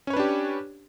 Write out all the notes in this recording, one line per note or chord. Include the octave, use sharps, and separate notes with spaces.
C#4 D4 G4 B4 C#5